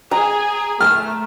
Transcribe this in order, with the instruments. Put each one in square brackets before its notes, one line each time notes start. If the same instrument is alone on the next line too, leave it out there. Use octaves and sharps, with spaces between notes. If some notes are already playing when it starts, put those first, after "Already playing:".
[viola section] G#4 G#5 [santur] A#5
[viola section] A3 [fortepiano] F6